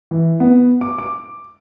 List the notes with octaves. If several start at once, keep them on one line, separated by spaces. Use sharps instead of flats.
E3
B3
D6
D6